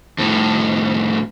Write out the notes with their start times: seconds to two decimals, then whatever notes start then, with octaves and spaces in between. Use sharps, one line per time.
0.18 F2 A2